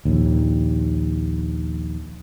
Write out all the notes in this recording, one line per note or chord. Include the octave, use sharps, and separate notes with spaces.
A#1 D#2